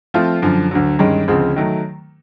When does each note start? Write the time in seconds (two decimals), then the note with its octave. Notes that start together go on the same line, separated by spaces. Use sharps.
0.14 F3 A3 C4 F4
0.42 F#2 D3 F3
0.71 D2 D3 F#3
0.99 G2 D#3 G#3 C#4
1.28 D2 C#3 F3 G#3 C4
1.56 D#3 F#3 A3